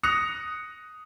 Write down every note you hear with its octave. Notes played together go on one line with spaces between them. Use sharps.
D#6 F#6 A#6 C#7 F7